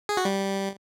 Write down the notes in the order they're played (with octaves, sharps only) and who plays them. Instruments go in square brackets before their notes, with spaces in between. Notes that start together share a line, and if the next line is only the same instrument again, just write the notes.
[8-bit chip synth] G#4
F#4
G3